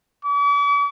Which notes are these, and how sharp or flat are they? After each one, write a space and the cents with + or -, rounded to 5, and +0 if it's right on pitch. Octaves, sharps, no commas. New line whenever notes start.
D6 -45